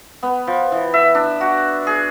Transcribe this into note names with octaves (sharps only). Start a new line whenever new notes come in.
B3
F3
E3
E5
D4
F#4
G#4